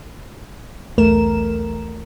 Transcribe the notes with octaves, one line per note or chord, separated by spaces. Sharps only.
B1 E2 A3 A#4 E7